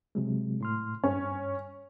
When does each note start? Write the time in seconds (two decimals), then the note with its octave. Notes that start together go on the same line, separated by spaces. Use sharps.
0.15 C3 F#3 G#3
0.61 A2 C6 F6
1.04 G2 C#4